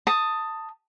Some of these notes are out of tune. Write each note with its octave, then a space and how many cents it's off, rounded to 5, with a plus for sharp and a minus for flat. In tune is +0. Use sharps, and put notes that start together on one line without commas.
A5 +20 D#6 +0